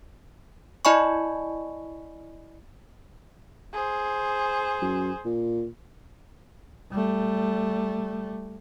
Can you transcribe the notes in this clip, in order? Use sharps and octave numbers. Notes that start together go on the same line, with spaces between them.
E4 D5 D#5 G#5 B5 C#6
G#4 C5
F#2
A#2
G3 A3